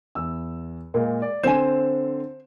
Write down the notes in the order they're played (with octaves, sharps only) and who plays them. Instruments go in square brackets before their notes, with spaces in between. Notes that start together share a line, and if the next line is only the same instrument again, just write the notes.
[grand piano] E2 E6
A#2 G#3 A#3
D5
[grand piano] D3 C4 E7 [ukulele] C5 G#5